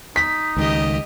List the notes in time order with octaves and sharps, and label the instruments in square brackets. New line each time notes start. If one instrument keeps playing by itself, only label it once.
[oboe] D#4 [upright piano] B6
[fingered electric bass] C#2 D#3 [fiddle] G4 D#5